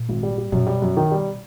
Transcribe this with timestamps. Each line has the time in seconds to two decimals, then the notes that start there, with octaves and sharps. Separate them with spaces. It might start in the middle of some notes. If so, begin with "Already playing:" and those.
Already playing: A#2
0.09 G#1
0.23 G3
0.38 G3
0.52 F#2 B2
0.59 A#2
0.66 B2 G3
0.82 F#2
0.97 D#3
1.11 G3